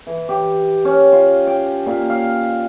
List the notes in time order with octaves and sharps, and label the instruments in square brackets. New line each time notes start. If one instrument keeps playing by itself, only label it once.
[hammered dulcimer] E3
G4
C#4
F4
G5
A#2
F5